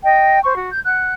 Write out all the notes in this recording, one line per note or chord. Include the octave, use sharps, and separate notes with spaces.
D#5 G5
C5 C#6
F#4
G6
F#5 F#6